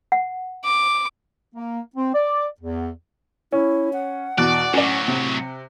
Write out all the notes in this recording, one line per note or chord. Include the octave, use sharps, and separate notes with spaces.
F#5
D6
A#3
C4
D5
E2
C#4 E4
F#5
E2 B2 D5 F#6
A2 F#3 C#4 D5
C3